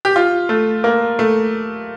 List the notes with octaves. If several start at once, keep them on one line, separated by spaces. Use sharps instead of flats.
G4
F4
A3
A#3
A3